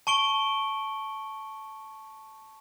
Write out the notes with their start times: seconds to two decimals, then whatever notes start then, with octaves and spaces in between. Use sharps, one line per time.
0.07 A5 C#6 D7 G7